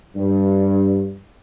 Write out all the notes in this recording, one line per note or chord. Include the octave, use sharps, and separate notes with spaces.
G2